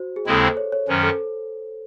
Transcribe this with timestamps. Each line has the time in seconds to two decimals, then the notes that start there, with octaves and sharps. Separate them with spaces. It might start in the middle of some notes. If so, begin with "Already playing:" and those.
Already playing: F#4 C5
0.16 G#4
0.26 D#2 C#3 G#3 C4 E4 A4
0.43 C5
0.57 C#5
0.72 C#5
0.88 F#2 D#3 F#3 C#4 C5
1.03 A4